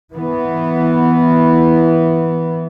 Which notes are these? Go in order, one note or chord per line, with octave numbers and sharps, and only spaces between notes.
E3 B3